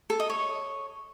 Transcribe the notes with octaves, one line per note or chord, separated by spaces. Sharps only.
A4
D#5
C#5